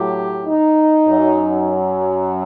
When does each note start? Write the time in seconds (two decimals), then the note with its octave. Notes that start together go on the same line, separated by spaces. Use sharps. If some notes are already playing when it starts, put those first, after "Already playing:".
Already playing: A2 F#3 G4
0.46 D#4
1.08 F#2 F#3